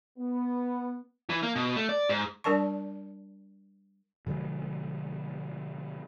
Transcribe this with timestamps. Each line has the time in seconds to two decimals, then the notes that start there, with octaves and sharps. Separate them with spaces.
0.19 B3
1.30 E3
1.43 A#3
1.56 B2
1.76 A3
1.89 D5
2.09 G#2
2.44 G3 D4 A#4 D5 A5 C#6
4.27 B2 D3 F3 G#3